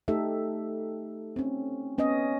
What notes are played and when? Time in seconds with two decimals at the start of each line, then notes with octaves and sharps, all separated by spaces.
0.08 A3 D#4 G4 A4 E5
1.36 C4 C#4
1.98 B3 C#4 C#5 D#5